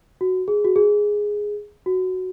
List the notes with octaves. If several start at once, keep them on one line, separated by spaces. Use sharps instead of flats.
F#4
G#4
F#4
G#4
F#4